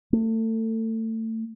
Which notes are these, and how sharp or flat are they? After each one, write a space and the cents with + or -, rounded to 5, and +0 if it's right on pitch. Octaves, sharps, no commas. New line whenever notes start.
A3 +30